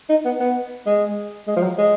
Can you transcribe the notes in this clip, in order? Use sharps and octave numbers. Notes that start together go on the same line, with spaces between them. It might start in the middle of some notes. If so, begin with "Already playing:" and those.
D#4
B3
B3
G#3
G#3
F3
F#3
G#3